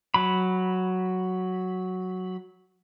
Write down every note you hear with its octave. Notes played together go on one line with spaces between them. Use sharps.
F#3 B5